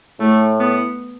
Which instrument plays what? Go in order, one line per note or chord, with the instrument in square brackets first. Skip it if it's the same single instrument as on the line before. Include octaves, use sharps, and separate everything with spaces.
[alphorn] A2 [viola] A3
[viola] B3